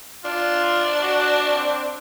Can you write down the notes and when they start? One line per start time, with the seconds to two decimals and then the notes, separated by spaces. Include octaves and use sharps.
0.25 D4 F4
1.02 F#4
1.48 C4